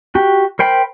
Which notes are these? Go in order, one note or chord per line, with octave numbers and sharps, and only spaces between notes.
F#4 G4
A#4 C5 G5 B5